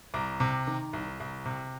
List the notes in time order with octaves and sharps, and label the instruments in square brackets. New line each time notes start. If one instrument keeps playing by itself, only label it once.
[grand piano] C2 A#5 D6
C3
D#3
C2
C2
C3